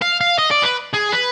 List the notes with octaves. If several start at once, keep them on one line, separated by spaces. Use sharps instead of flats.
F5
F5
D#5
D5
B4
G#4
B4